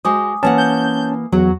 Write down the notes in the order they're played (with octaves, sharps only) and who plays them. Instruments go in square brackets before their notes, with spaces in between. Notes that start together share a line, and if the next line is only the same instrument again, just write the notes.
[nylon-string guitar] G#3 F#4 C5 [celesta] G#5 D6 D#6
[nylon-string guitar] E3 A#3 F#5 [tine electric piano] C#4 A5
[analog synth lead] G6
[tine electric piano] E2 [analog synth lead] F#3 [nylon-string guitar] F#4